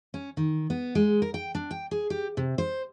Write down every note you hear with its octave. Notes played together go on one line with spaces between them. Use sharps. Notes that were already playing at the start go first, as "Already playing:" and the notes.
C#4
D#3
B3
G#3
A#4
G5
D4
G5
G#4
G4
C3
C5